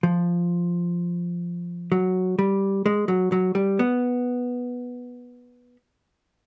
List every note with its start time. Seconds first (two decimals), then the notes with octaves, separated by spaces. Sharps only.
0.03 F3
1.92 F#3
2.39 G3
2.86 G#3
3.08 F#3
3.32 F#3
3.55 G3
3.79 B3